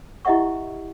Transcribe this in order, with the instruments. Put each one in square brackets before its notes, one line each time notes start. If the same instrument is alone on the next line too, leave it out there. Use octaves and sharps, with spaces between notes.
[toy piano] E4 G4 D#5 E5 F#5 C#6